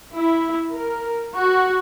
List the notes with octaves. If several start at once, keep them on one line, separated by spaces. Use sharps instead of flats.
E4
A#4
F#4